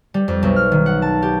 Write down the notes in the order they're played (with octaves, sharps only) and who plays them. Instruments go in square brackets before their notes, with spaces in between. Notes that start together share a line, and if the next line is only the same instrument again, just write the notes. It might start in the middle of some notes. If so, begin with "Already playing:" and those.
[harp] G3
F2
B1
F6
D#3
F#5
A5
G4